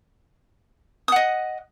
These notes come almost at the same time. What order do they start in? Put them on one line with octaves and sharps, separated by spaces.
D#6 F#5 D#5